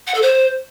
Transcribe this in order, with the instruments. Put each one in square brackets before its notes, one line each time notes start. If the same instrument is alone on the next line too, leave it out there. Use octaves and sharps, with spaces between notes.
[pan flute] F#5
A4
C5